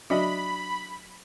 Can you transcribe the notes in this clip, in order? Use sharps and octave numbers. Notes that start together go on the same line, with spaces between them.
F#3 D4 F#4 D#5 E5 B5